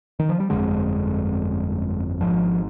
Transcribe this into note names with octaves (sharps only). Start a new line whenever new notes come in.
D#3
F3
G3
G1 F2 D3 G#3
G#1 G#2 F3